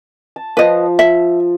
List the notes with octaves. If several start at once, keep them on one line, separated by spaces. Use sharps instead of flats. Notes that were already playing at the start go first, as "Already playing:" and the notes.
A5
F3 B4 D#5
E5